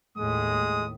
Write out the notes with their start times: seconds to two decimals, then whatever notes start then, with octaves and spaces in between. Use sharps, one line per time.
0.18 D#2 A2 G#3 D#6